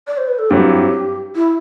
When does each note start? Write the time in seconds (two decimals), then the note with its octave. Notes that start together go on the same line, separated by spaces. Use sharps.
0.07 D5
0.18 C5
0.28 B4
0.39 A4
0.50 G2 F#3 C4 E4 G4
1.35 E4